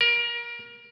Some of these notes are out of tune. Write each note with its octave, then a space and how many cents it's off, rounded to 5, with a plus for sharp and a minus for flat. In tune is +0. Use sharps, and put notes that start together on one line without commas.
A#4 +25